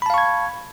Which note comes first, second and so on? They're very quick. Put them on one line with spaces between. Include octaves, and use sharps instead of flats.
B5 A5 F5 C#6 G#6